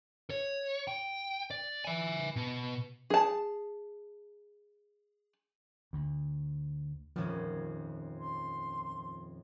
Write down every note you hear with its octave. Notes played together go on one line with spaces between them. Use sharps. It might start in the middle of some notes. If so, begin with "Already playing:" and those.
C#5
G5
D5
E5 G#5
B2
G#4 A5
D2
D#1 F2 F3 C#4
C6